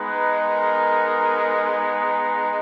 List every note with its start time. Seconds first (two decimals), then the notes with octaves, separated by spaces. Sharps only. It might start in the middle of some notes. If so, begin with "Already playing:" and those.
Already playing: G#3 B3 D#4 B4
0.48 A#4